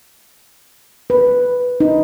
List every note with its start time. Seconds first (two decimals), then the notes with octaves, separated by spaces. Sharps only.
1.10 B4
1.80 D#4